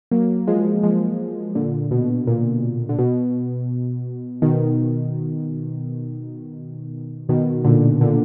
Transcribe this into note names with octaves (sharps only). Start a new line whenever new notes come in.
F#3 A#3
F3 G#3
F3 G#3
A#2 D3
B2
A#2
D3
B2
B2 D#3
B2 D#3
A#2 D3
A#2 D3